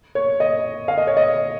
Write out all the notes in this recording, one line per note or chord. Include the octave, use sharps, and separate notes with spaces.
C#5
D#5
F5
D#5
C#5
D#5